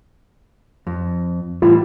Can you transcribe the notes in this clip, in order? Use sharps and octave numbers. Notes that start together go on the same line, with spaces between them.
F2
A2 E3 G3 F4